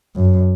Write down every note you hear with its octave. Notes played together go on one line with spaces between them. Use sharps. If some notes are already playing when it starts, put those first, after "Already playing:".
F#2